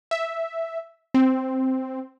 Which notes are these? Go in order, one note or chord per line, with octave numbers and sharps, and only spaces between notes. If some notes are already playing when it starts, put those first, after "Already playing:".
E5
C4